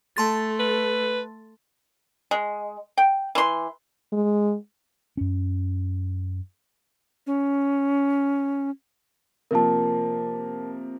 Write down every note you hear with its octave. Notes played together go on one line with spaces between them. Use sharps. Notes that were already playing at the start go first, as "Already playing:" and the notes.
A3 A5 C6 A6
B4
G#3
G5
E3 C6
G#3
F#2 C#4
C#4
C3 F3 A#3 A#4 A5